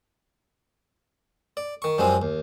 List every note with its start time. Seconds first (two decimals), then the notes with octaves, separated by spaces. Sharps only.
1.57 D5
1.82 D#3 C#6
1.98 F#2 F3 G3 G#3 C4
2.22 D#2